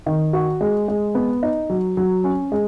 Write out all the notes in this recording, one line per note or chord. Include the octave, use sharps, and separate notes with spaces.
D#3
F#4
G#3
G#3
B3
D#4
F#3
F#3
C#4
G#3